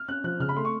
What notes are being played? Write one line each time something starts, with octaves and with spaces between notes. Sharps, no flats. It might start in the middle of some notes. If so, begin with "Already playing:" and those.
Already playing: F6
C#4 F#6
F3 F#6
C#3 F6
B5
A3 C6
C#6